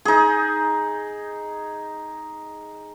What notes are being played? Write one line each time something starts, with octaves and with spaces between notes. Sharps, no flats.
D#4 G#4